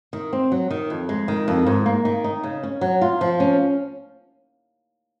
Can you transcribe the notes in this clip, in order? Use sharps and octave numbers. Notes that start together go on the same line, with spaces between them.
D#3
C4
F#3
D#3
F2
G#3
D#3
F2
G#2
A#3
D#3
D#4
C#3
C#4
F#3
F4
F3
C#4